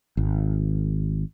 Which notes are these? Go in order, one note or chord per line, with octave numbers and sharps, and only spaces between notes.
G#1